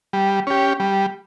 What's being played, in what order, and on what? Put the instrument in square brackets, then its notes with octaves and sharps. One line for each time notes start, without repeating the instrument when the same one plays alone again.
[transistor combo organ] G3
C#4 G4
G3